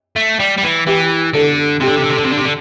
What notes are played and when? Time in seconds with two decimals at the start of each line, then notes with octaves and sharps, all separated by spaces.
0.16 A3
0.40 G3
0.58 G3
0.64 E3
0.87 E3 G4
1.34 D3 A4
1.81 C3 G4
1.88 D3
1.96 C3
2.03 D3
2.10 C3
2.18 D3
2.24 C3
2.32 D3
2.38 C3
2.45 D3